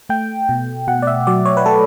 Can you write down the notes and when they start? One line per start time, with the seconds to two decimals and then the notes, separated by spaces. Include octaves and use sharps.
0.09 A3 G5
0.49 B2
0.87 B2 F#5
1.02 D5
1.07 E5
1.27 F#3 D5
1.45 C#5
1.57 B4
1.66 A3 A4